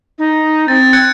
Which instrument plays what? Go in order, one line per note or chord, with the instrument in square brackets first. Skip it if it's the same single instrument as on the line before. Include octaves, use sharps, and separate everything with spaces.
[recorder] D#4
[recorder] C4 [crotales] A6
[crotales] F#6 G#6 C#7